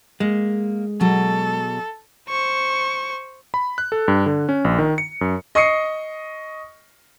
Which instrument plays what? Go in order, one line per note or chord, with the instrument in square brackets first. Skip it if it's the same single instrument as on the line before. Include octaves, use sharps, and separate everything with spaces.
[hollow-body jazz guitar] G#3 [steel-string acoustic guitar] A#3
[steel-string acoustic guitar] B2 F#3 G#4 [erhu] A4
[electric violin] C5 C#6
[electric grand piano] B5
F#6
A4
G2
D3
C#4
A#1
D#3
C#7
F#2
[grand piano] D#5 C#6 D#6 C7 C#7